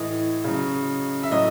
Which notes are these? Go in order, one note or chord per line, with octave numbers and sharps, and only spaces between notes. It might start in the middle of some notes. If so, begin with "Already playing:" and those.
Already playing: A2 E3 D#5
C#3 F#3
E5
A2 F#3 D#5